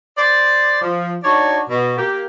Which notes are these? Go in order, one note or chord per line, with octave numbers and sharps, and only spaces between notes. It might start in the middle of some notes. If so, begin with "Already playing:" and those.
C5 D5
F3
D4 D#4 F#4 C#5 D5
B2
A#3 G4